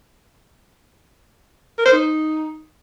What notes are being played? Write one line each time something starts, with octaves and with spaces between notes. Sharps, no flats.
A#4
C5
D#4